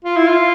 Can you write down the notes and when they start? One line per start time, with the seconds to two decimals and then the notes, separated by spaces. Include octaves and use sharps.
0.05 F4
0.16 E4
0.28 F4